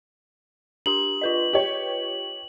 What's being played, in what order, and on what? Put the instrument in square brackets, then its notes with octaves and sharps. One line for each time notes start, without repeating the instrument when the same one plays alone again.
[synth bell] D4 G4 C6 [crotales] F#7
[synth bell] F4 B4 D#5
[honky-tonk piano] G4 C#5